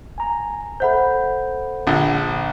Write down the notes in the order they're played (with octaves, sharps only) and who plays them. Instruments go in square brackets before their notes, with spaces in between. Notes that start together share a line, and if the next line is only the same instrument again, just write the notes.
[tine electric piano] G#5 A#5
[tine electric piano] A4 E5 G6 [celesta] C5 F#5 B5
[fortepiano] A#1 D3